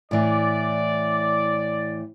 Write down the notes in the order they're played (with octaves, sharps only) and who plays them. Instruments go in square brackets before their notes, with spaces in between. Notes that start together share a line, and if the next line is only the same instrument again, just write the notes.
[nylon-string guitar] A2 E3 [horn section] D5